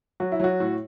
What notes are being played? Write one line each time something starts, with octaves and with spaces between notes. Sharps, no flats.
F#3 F#4
E4
F#3 F#4
A2